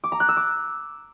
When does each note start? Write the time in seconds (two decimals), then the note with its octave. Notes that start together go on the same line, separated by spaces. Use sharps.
0.04 D6
0.12 A#5
0.20 F#6
0.28 E6
0.37 D6